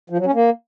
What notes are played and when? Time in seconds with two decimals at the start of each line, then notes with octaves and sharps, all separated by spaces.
0.10 F3
0.18 F#3
0.26 C#4
0.34 A#3